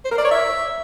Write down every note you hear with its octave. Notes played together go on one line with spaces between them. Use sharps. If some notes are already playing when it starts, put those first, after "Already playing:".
C5
A#4
D5
C#5
E5